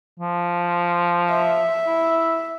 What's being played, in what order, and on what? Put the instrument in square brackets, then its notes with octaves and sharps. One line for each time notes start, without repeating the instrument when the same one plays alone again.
[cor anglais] F3
[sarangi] E5
[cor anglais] E4